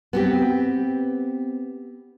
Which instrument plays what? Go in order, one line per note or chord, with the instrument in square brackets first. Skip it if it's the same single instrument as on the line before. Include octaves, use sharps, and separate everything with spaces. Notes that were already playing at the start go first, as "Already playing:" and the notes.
[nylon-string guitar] B3 C4 G4